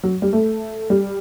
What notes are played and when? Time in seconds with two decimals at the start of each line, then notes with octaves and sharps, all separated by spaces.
0.03 F#3
0.22 G3
0.33 A3
0.90 G3